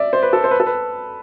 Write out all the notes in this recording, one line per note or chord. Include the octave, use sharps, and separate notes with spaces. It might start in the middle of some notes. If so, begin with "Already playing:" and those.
Already playing: D5 E5
C5
B4
A4
C5
B4
A4
B4